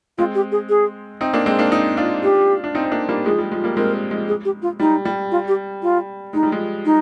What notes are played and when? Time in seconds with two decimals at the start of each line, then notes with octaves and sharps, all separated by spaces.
0.18 G#3 C4 F4
0.35 G4
0.52 G#4
0.69 G#4
1.21 C4 D#4
1.33 A#3 D4
1.46 G#3 C4
1.59 A#3 D4
1.71 C4 D#4
1.97 D4 F4
2.23 G4
2.64 D4
2.75 C4 D#4
2.85 C4
2.91 A#3 D4
3.09 G3 A#3
3.25 F3 G#3 G#4
3.38 G3
3.51 F3 G#3
3.64 G3 A#3
3.77 G#3 C4 A#4
4.11 F3 G#3
4.28 G#4
4.45 G4
4.62 F4
4.80 G3 D#4
5.05 G3
5.31 F4
5.48 G4
5.82 F4
6.33 G#3 D#4
6.43 G3
6.52 F3 G#3
6.86 D#4